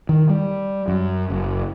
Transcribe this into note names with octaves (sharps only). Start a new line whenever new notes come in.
D#3
G3
F#2
F#1